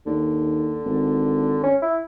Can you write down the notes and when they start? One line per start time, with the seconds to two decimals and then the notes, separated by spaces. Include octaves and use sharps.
0.06 D#2 D3
0.86 G#1
1.63 C#4
1.82 E4